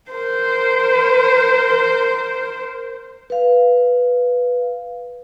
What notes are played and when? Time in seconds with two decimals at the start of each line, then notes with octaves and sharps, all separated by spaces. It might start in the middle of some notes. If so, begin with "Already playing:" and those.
0.10 A#4 C5
3.30 B4 F5